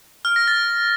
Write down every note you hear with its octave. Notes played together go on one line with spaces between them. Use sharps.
F6
A#6
A6